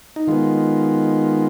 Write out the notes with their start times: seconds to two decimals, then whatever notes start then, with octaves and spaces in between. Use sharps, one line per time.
0.16 D#4
0.27 D#3 G#3 B3 F4